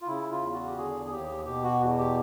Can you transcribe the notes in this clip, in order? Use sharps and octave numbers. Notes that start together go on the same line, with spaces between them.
F4
C#3 E4
F4
E2
F#4
G4
D3 G#4
G#4
D#2 G4
B2 G4
F#4
E2
G4